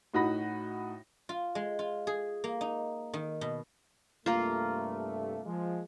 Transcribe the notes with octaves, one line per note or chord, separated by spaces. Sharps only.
A2 D#4 F#4 B5 A#6
F4
G#3
F4
G#4
A#3
D#4
D#3
B2
G2 C3 A3 A#3 F4
F3 G#3